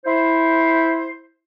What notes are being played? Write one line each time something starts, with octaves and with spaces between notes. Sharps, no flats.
E4 C5